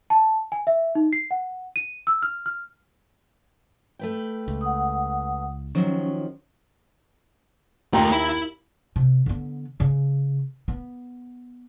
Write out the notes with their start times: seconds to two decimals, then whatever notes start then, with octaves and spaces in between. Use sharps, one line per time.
0.10 A5
0.52 G#5
0.67 E5
0.95 D#4
1.13 C7
1.31 F#5
1.76 D#7
2.07 E6
2.22 F6
2.46 F6
3.99 A3 B4 G5
4.48 C#2
4.61 F#5 D#6
5.75 D#3 F3 F#3 C#4
7.93 D#2 A3 F4 G5 A#5
8.12 E4 B5
8.96 C3
9.26 D3 B3
9.80 C#3
10.68 B3